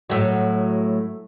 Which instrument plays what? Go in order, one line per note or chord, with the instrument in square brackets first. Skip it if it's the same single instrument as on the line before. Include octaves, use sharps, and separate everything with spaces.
[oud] A2 F#3